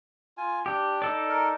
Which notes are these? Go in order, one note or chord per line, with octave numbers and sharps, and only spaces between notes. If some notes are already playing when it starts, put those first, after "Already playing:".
F4 G#5
D4 G4
D#4 A4 D5
A#4